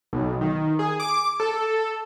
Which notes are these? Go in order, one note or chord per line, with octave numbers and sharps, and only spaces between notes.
B1
D#3
G#4
D6
A4